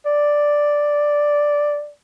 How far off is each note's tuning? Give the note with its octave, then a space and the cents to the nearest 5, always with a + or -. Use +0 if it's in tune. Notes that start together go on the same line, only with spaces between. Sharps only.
D5 +0